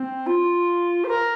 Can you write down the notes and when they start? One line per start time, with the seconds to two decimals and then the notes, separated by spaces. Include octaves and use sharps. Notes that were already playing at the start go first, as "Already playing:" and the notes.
Already playing: C4
0.26 F4
1.04 C5
1.08 A#4